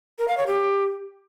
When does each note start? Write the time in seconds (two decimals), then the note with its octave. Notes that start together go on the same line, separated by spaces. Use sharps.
0.18 A#4
0.28 F5
0.37 C#5
0.47 G4